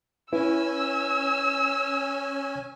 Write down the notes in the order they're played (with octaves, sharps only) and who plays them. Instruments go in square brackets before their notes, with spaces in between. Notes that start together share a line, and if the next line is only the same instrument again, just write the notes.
[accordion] C#4 G#5 [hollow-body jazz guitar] E4 [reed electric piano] B4 [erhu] E6